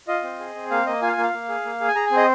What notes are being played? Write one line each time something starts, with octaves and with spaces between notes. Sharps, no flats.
F4 D#5
C4
G#4
C4
A#3 F5
A#3 D#5
F4 G#5
F5
G#5
A#3 F5
A#3
G#4
A#3
G#4
G#5
G#4 A#5
G#5
C4
D#5